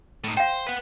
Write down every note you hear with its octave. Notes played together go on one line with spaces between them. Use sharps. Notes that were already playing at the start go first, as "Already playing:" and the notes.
A2 D#4
C5 F5 G5
B4 F#5